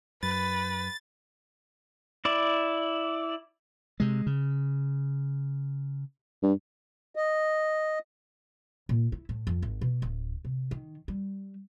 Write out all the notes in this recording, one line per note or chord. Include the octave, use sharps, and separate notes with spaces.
F#2 B4 A6
E4 D5
C3 G#3
C#3
G2
D#5
A#2
E4
A2
F2
G#1
B2
D1
C3
D#3
G3